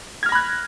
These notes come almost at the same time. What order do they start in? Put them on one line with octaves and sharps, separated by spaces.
G#6 F6 A#6 B5 F#6